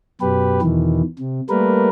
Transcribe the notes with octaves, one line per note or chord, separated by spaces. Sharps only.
F#2 B2 G4 B4
E2 B2 D#3 E3
C3
G3 A3 A#3 A#4 B4